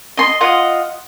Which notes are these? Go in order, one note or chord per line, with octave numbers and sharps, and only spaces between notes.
D#5 C6
F4 D#5 F#5